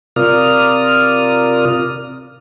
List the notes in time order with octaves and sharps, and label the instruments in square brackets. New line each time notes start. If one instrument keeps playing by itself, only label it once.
[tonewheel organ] C3 F4 A#4 D5 D#6 F6